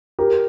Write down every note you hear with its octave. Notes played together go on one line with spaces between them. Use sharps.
G4 A#4